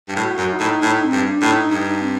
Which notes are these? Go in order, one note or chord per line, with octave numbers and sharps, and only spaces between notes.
G2
A2
F#4
F#2
D#4
A2
A2 D#4
C4
G2
D4
A2
D#4
G2 D#4
C4